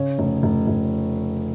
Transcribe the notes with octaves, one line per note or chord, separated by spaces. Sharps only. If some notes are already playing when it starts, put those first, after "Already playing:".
Already playing: C#3 C#5
F1
F1
F1